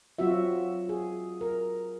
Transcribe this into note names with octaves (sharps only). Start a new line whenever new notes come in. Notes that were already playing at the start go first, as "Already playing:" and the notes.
F#3 C4 F4 F#4 E5
G#4
A#4